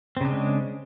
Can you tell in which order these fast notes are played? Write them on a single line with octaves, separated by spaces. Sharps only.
C4 C#3 D4 G#3